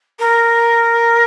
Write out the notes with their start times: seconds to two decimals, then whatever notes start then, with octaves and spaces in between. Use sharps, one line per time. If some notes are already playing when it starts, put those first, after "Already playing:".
0.19 A#4